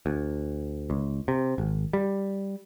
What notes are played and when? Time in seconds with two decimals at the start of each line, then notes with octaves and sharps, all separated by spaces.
0.06 D2
0.90 C#2
1.28 C3
1.58 G#1
1.93 G3